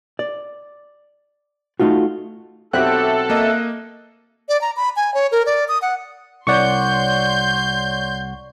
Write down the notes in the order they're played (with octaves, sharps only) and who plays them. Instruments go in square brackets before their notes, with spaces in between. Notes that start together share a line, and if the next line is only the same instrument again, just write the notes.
[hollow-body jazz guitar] D5
A3 D#4 F4 F#4
[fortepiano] B1 C4 F#4 [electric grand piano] G4 G5 [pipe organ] A4 [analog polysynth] E5 F#6
[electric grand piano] A#3 D#5
[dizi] D5
A#5
B5
G#5
C#5
A#4
D5
D#6
F#5
[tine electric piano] C2 F#5 [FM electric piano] C#5 D5 C#6 [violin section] C6 G6